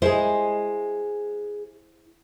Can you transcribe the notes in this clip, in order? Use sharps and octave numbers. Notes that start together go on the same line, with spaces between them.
G#3 E4 G#4 C5